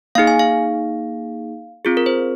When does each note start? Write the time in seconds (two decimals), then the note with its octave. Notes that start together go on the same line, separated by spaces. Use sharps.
0.15 A#3 D#4 G#4 F5
0.27 G#5
0.39 F5
1.85 C4 F4 G#4
1.97 A#4
2.06 C5